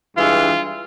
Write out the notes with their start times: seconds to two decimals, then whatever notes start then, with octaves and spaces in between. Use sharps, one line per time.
0.17 G2 E3 G#3 F4